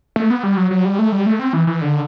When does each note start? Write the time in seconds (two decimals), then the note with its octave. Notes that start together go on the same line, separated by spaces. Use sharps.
0.16 A3
0.30 B3
0.43 G3
0.57 F#3
0.71 F#3
0.85 G3
0.99 A3
1.12 G3
1.26 A3
1.39 C4
1.53 E3
1.67 E3
1.81 D3